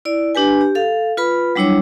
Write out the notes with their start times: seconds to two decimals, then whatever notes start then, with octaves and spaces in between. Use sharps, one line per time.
0.05 E4 D5
0.35 D4 G4 B4 G#5
0.61 G4
0.75 A4 F5
1.17 F4 B4 B5
1.55 F#3 G3 D4 E4 C#5 D6